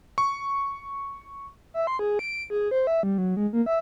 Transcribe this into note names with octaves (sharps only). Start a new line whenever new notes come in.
C#6
E5
C6
G#4
D7
G#4
C5
E5
G3
F#3
G#3
A#3
E5